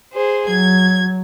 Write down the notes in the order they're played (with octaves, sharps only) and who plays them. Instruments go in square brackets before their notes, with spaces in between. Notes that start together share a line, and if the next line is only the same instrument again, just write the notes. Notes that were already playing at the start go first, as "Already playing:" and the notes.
[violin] G#4 C5
[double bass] F#3 [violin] G#6